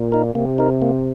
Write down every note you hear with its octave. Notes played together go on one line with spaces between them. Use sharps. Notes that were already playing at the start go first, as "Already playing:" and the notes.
Already playing: A#2
D#4 A#4
C3 A#3
D#4 A#4
A#3